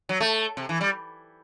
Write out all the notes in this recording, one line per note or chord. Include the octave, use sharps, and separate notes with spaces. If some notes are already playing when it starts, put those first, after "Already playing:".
F#3
A3
C3
E3
G3